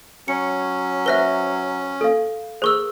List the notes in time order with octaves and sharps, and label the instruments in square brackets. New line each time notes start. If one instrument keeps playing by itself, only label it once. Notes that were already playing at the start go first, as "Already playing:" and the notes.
[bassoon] F#3 [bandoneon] C#4 [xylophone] C#7
[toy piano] B4 C5 [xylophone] E5 A#6 G7
[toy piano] A4 F5
[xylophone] G#4 A#4 E6 [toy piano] C5 C#6